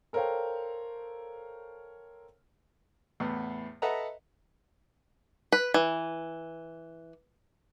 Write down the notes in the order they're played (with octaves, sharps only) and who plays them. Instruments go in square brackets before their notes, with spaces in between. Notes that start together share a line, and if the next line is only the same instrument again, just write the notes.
[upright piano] A4 A#4 C5 C#5 F5 G5
[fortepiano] E2 A2 B3
A4 B4 D#5 E5 F#5 A#5
[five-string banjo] B4
E3